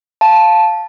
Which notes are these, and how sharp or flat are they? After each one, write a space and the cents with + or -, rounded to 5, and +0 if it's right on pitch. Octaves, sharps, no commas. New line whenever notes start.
F5 +0 A5 -5